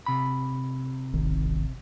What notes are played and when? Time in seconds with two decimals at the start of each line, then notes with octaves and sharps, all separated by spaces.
0.06 C3 B5
1.14 D1 G#1 D#3